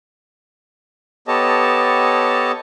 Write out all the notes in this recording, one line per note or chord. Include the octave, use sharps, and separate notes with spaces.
B3 G4 A4 C#5 D#5 A5